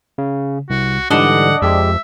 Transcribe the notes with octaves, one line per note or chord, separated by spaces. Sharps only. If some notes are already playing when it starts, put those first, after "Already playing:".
C#3
C2 F#4
G#2 D3 E3 G3 D4 D#5 F#5
F2 G#3 G4 E5